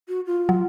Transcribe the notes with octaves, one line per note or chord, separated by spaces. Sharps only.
F#4
F4
F#3